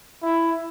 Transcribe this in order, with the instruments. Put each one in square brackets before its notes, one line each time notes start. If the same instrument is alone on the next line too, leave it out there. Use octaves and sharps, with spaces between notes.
[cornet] E4